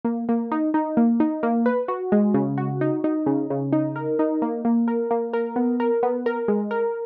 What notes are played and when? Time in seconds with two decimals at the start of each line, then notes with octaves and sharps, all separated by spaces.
0.05 A#3
0.29 A#3
0.52 D#4
0.74 D#4
0.97 A#3
1.20 D#4
1.43 A#3
1.66 B4
1.88 F#4
2.12 G#3
2.34 C#3
2.58 F#4
2.81 D#4
3.04 D#4
3.26 C#3
3.50 C#3
3.73 D#4
3.96 A#4
4.19 D#4
4.42 A#3
4.65 A#3
4.88 A#4
5.11 A#3
5.33 A#4
5.56 B3
5.80 A#4
6.03 B3
6.26 A#4
6.48 G#3
6.71 A#4